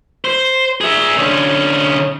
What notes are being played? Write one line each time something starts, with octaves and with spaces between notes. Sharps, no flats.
C5
G#4 E5
D3 C#4